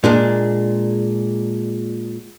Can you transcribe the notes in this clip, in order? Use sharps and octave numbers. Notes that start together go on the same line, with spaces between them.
A#2 G#3 D4